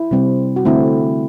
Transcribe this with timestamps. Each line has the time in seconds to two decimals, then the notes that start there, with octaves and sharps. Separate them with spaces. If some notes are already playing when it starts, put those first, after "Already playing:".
Already playing: E4
0.11 C3 G3 C4
0.56 F#4
0.65 D3 A3 C4 E4